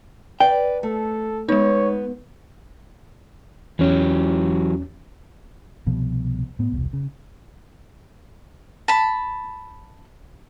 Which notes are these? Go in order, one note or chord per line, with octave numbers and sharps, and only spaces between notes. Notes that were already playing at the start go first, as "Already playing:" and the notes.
B4 D5 G5
A3 A4
G#3 B3 D#4 C#5
E2 E3 F#3 C#4 G4
C2 B2 F3 B3
A2 B3
E1 C2
C#3
A5 B5